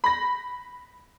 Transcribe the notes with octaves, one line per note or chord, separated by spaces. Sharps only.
B5 A#6